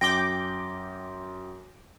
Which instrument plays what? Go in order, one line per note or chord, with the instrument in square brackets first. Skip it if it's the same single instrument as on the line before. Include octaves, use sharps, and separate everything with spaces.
[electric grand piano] F#2 [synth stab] G5 D6 [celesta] A#6 G7